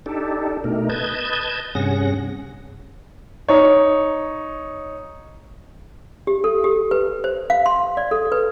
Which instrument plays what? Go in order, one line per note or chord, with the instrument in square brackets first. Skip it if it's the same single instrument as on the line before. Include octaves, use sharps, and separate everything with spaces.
[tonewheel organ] D4 D#4 G4 A4
B2 A3 D#4 A#4
B4 D#5 A5 G6 G#6
G2 C3 C#4 G#4 F#5 A#6
[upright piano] D#4 C#5
[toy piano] G4
A4
G4
B4
C5
F5
C6
D5
A4
B4